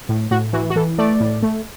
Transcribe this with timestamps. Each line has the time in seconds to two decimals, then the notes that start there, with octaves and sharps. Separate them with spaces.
0.09 A2
0.31 A2 F#4
0.53 E3 F#4
0.70 F#4
0.76 E3 A4
0.98 A3 D5
1.20 A2
1.43 A3